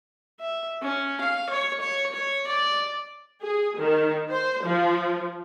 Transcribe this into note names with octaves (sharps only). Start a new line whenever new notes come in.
E5
C#4
F5
C#5
C#5
C#5
D5
G#4
D#3
C5
F3